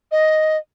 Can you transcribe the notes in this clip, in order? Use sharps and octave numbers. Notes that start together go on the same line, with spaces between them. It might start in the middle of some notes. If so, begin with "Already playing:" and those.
D#5